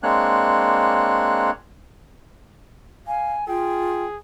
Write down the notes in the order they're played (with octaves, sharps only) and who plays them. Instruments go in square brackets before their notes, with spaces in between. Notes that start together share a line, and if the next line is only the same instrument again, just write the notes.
[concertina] G#3 A#3 C4 D4 C#5 F#6
[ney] F5 [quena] G#5
[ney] F4 [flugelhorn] G#4 [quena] G5